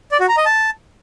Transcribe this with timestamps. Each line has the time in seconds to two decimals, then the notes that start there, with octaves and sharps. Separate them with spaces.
0.12 D5
0.20 F#4
0.29 A#5
0.37 D#5
0.46 A5